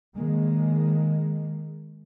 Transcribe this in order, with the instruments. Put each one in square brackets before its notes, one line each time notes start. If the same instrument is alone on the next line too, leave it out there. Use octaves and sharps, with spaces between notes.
[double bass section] D#3 G#3 A#3